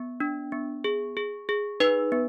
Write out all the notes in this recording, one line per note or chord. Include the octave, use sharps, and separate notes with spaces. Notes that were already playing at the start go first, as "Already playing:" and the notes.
Already playing: B3
D4
B3
G#4
G#4
G#4
D#4 B4
B3